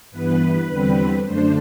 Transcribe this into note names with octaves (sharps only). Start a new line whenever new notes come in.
G2 E3 B3 B4
E2 D3 G3 C4
F#2 D3 A3 D4 C5